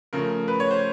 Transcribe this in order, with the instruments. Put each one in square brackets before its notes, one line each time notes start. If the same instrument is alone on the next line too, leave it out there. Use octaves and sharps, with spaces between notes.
[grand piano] C#3 F3 A3 A#4
B4
C#5
C5